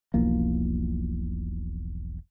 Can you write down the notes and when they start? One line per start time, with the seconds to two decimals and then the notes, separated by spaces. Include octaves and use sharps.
0.14 E1 B1 F3 A#3